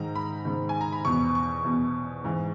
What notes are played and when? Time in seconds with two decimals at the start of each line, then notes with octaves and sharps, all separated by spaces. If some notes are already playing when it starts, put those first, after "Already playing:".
Already playing: G#2 D#3 A#5
0.15 B5
0.45 G#2 D#3
0.69 G#5
0.81 A#5
0.92 B5
1.05 E2 B2 C#6
1.35 C#6
1.64 E2 B2
2.24 G#2 E3